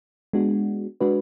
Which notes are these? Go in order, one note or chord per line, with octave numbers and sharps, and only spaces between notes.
G#3 B3 D4 F#4
G#3 D4 F#4 B4